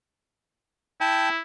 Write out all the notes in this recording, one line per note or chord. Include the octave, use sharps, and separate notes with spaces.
E4 G5 A5